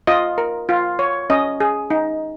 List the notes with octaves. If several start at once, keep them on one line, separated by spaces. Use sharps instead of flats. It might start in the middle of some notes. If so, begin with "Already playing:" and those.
F4 D#5
A#4
F4
C#5
C#4 D#5
G#4
D#4